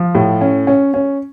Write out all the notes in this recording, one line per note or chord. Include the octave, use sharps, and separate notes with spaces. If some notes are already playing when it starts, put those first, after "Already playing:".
Already playing: F3
A2
C#4
C#4
C#4